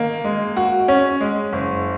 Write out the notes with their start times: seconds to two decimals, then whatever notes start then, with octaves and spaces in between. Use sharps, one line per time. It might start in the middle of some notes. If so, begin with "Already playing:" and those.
Already playing: D#3 A#3
0.24 G#3
0.57 F#4
0.88 C#4
1.21 G#3
1.53 F#1